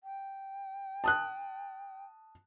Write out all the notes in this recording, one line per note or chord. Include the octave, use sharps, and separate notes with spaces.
G5
A5 D#6 F#6